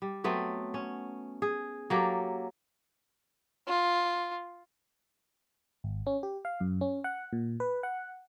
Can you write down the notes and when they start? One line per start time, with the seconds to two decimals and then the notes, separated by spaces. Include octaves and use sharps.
0.02 G3
0.24 F#3 A3 B3 C4
0.74 C#4
1.42 G#4
1.90 F#3 A#3 G4 A4
3.68 F4
5.84 G#1
6.07 C#4
6.23 G4
6.45 F5
6.60 F#2
6.81 C#4
7.04 F#5
7.33 A#2
7.60 B4
7.83 F#5